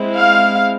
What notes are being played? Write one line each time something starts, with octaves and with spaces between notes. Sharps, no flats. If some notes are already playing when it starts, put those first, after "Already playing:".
Already playing: G#3 C4 E4
F5